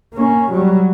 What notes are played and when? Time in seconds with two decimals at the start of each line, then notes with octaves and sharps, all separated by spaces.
0.14 A#3 C#4
0.51 F#3 G3